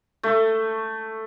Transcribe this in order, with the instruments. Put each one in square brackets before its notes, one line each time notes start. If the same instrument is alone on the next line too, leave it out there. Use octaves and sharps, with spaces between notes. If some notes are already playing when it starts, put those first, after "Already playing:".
[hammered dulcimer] A3